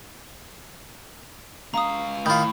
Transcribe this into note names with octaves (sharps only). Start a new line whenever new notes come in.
G#3 F5 A#5 D#6
A2 D#3 F4 B5 G6